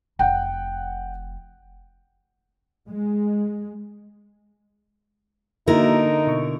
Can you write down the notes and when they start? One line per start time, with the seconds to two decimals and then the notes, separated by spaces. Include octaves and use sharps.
0.19 F1 F#5 G5
2.89 G#3
5.67 D3 A#3 D#4 E4 F#4 A#4
6.27 B2 C#6